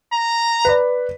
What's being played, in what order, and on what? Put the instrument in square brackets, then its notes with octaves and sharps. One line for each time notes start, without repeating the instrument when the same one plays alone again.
[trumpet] A#5
[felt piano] B4 D5